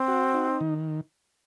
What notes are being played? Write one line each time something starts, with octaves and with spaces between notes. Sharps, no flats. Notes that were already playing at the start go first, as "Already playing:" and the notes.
Already playing: C4
F#4
D#4
D#3